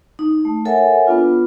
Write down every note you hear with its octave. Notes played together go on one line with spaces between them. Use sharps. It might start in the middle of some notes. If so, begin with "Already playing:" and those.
D#4
A3
A4 A#4 C#5 E5 F#5 G#5
B3 D4 F4 B4